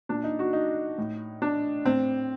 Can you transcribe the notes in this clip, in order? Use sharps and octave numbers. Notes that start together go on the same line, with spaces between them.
A#2 D4
D#4
F#4
D#4
A2
D4
A2 C4